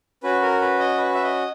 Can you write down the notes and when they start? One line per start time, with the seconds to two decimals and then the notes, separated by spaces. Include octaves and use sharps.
0.23 C#4 F#4 B4
0.42 A#4
0.61 B4
0.79 D#5
0.98 B4
1.14 E5
1.23 D#5